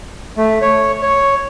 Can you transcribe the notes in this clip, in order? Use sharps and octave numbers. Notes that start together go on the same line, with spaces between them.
A3
C#5
C#5